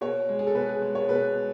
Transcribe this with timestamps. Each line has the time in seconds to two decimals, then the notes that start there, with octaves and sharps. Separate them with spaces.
0.01 B2 C#5
0.29 G#3
0.39 G#4
0.47 A4
0.55 B2 B4
0.69 G#4
0.82 G#3
0.95 C#5
1.09 B2 B4
1.36 G#3